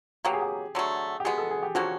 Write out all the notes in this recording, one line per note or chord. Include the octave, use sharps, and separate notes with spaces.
B2 F#3 A#3 G4
G#4
G4
D3 F#3 A3
G4
B2 G#3 B3 G#4
A4
G#4
G4
D3 F3 A#3 C#4 F#4